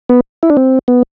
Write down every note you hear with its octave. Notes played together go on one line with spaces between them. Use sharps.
B3
E4
D4
C4
B3